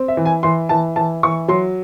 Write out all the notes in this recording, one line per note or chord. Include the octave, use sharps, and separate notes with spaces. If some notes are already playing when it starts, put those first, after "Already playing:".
Already playing: C4
E5
E3
G#5
E3 C6
E3 A5
E3 A5
E3 C#6
F#3 C6